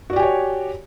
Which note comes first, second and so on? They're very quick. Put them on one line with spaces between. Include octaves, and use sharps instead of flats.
F#4 D5 G4 G#5 C#5